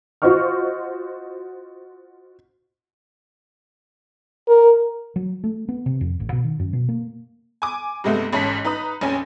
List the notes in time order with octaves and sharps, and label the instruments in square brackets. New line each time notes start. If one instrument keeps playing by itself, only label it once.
[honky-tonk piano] F4 F#4 C5 D#5 C#6 F6
[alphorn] A#4
[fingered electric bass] F#3
A3
B3
C3
F2
A1
B2
D#3
F#2
B2
A#3
[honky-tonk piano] G#5 D6
G2 C3 G#3 A3 B3
A1 G#2 C#4 A5 B6
D#4 B4 A#5 B5 D#6
A#1 F2 C#4 G#5